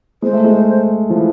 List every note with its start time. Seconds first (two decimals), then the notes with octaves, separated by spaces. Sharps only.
0.22 G#3 C5
0.33 A3
0.44 G#3
1.10 F3
1.16 E3